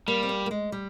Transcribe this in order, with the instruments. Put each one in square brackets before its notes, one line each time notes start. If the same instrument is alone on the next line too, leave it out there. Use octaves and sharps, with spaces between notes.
[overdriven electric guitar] G3 [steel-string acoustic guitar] A#3
[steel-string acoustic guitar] C4
A#3
A#3
G#3
G3